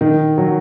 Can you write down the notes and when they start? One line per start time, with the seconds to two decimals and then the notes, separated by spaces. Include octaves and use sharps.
0.01 D#3
0.38 F#3